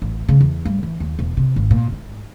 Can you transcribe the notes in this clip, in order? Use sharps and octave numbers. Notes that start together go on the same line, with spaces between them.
A1
C#3
E2
G2
E3
D#2
E1
C3
G#1
A#2
G#2